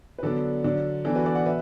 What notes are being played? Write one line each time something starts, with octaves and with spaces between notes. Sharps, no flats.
B4
D3 F#3 B3 D4 A4
D3 F#3 D4
E3 B3 D4 A4
F#4 B4
A4 D5
D5 F#5
B2 B4 E5